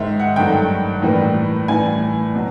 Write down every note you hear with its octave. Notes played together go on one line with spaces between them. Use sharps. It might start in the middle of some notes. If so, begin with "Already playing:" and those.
Already playing: G#2 D#3 G#3 E5
F#5
G2 D#3 F#3 A3 G5
A2 E3 G3 A#3
A2 E3 G3 G#5
B2 F#3